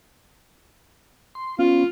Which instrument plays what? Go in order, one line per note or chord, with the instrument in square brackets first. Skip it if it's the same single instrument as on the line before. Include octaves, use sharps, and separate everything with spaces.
[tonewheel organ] C6
[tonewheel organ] B3 C#4 [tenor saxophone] F4